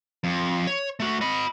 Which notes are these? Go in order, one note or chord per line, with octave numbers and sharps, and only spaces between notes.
F2
C#5
A3 F#4
D#5 B5